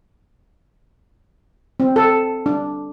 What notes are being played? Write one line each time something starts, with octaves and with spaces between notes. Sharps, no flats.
C4
A4
D4